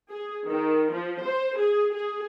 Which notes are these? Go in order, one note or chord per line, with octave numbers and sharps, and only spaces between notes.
G#4
D#3
F3
C5
G#4
G#4